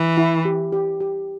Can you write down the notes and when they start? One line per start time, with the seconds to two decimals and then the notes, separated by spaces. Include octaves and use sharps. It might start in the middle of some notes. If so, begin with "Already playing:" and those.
Already playing: E3
0.17 E4
0.45 G4
0.72 G4
1.00 G4